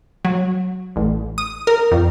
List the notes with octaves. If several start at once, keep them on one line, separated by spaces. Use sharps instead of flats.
F#3
A1
D#6
A#4
F2